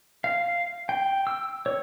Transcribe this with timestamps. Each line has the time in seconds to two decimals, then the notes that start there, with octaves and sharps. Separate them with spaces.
0.24 F5
0.89 G5
1.27 E6
1.66 C#5